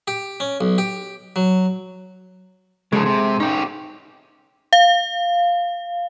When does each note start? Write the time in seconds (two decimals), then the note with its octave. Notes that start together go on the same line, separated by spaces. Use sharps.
0.08 G4
0.40 C#4
0.61 B1
0.78 G4
1.36 F#3
2.92 C#3 F3 G#3 G#4 A4
3.06 C3
3.40 C#4 D#4 G4
4.73 F5